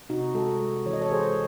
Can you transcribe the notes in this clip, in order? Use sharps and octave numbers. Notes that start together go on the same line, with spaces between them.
C3 D#4 F#4
G#3 F#4 A4
G#3
E3 C#5
D#5
A4 C#5
G#3 G#4 C5